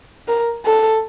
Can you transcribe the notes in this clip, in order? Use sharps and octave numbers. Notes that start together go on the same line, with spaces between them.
A#4
A4